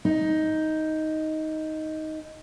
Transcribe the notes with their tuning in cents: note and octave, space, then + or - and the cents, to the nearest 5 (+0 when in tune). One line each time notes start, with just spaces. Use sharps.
D#4 +10